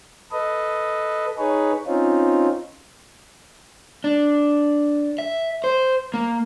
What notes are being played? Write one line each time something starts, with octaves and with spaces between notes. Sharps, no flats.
A4 B4 D#5
D#4 G#4 B4 C#5
C4 C#4 D#4 F4
D4
E5
C5
A#3